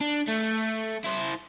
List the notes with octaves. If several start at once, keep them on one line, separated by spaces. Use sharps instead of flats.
D4
A3
E4 C5